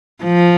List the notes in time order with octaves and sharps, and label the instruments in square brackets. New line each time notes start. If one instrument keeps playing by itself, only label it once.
[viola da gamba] F3